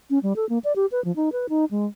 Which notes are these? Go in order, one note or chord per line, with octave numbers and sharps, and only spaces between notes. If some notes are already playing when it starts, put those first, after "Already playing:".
C#4
G3
A4
A#3
D5
G4
B4
F3
D#4
B4
D#4
G#3